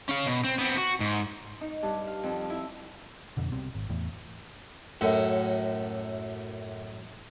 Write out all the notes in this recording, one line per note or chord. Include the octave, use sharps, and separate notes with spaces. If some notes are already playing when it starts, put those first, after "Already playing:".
C#4 F5
B2
C4
B3 C4
F#4
G#2
D#4
G2
F5
F2
E4
F2 B2 D3
C2 B2 G3 C4
G#1
E2 A2
F#2 A2